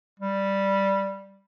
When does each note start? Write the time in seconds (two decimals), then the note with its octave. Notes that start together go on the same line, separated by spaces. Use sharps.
0.20 G3